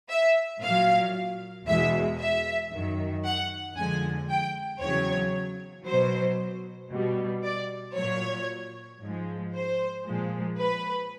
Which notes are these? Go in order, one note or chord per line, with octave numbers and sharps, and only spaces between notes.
E5
A#2 F#3 F5
E2 B2 G#3 E5
E5
F#2 D#3 F#3
F#5
F2 D3 F3 G#3 G#5
G5
E2 C#3 F#3 C#5
B2 F#3 C5
B2 G3
D5
A#2 F#3 C#5
G#2 F3 G#3
C5
A#2 F3 G#3
B4